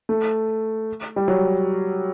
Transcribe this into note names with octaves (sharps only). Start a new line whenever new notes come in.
A3
G3
F#3